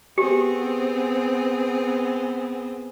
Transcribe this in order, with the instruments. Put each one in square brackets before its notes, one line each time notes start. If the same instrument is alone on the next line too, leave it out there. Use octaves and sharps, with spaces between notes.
[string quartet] B3 C4 G#4 [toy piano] G4